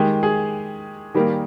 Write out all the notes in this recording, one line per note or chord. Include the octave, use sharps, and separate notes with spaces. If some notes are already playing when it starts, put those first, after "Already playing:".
Already playing: D#3 G#3 G4
G#4
D#3 G3 A#3